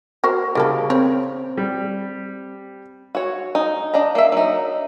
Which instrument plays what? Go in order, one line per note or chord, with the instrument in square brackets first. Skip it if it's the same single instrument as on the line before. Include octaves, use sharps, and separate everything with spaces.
[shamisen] F#4 A#4 C5
[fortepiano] C#3 A#4 [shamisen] G3 A#3 A4
[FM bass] C4 [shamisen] C#5
[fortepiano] G3
[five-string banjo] F#4 C#5
D#4
D4 D#5 A#5
A#3 E5
F#3 D#4